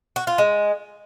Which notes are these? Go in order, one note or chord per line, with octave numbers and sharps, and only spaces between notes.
F#4
F4
G#3